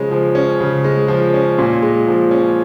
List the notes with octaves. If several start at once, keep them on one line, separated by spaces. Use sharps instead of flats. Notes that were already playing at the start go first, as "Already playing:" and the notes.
Already playing: C#3 F3 G#3 C#4
F3
C#4
C#3
G#3
F3
C#4
A#2
G#3
F3
C#4